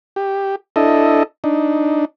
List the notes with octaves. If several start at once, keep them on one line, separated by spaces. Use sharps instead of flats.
G4
D4 E4 A4 D#5
D4 D#4